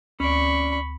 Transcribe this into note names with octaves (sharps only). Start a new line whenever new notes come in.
D2 C#4 D5 B5 C#6